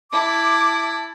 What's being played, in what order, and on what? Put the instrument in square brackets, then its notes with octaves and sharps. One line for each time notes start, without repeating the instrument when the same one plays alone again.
[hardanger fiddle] E4 A5 [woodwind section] D6